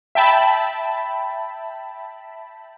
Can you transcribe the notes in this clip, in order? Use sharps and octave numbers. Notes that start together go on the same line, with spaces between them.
E5 G5 A5 B5